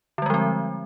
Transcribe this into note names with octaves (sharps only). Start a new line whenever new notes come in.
D3 F3 G3 G#3 C4